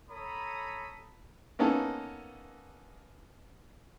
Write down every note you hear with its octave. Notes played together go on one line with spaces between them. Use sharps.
A4 C#5 A#5 B5 D#6
A#3 B3 C#4 D#4 A4